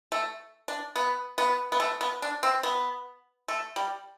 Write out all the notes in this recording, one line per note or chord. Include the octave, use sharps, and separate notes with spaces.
A3
D4
B3
B3
B3
A3
B3
D4
C4
B3
A3
G3